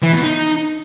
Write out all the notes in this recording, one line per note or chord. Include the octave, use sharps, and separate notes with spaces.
E3
B2
D#4